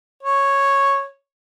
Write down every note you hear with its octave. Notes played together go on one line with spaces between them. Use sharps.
C#5